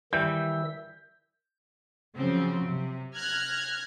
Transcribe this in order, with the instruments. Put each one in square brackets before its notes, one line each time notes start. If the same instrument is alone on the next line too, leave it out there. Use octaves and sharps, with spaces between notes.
[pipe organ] D#3 E5 E6 [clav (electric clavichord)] E3 G3 [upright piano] G6
[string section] C#3 F3 F#3 C4
C3
F6 F#6 G#6 A#6